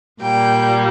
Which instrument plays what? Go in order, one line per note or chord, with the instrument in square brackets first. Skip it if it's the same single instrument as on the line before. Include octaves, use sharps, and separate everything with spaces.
[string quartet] A#2 G3 A#3 G5